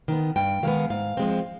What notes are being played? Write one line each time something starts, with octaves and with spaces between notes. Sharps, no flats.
D#3 B3
G2 G5
D#3 G#3 B3 F5
G#2 F5
F3 G#3 C4